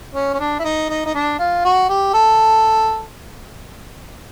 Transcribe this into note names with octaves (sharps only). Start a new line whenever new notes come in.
C#4
C#4
D4
E4
D#4
D#4
D#4
D4
F4
F#4
G4
A4